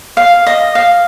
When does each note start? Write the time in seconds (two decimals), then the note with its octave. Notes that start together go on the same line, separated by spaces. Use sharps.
0.17 F5
0.47 D#5
0.75 F5